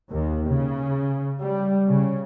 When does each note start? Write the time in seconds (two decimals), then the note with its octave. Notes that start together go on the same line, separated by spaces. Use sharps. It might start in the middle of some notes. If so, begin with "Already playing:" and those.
0.12 D#2
0.49 C#3
1.41 G3
1.89 C#3